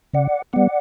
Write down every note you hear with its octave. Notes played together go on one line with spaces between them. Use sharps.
C#3 D5 F#5
G3 B3 D5 F#5